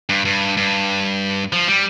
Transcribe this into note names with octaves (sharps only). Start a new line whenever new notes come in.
G2
G2
G2
F3
G3